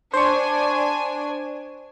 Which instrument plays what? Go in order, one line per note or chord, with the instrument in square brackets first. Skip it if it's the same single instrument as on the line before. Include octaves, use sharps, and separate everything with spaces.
[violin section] D4 G#5 [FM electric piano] C5 C#6